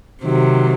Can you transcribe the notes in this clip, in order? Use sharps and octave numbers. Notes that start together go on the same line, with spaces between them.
C3 D#3 F#3